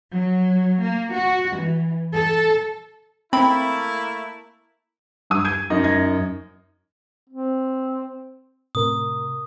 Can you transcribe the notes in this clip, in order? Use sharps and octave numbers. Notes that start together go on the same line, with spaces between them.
F#3
A#3
F#4
E3
A4
A3 A#3 C4 E4 B5
G2 D#6
G6 G#6 D#7
F#2 D#4 D#5
F#1 G#6 A#6
C4
A2 C3 A#4 D#6